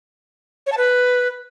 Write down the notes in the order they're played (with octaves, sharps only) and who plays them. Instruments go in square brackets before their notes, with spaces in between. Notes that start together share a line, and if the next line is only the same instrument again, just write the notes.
[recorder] C#5
A5
B4